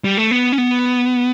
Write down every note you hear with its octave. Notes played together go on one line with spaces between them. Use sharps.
G3
A3
B3
C#4
B3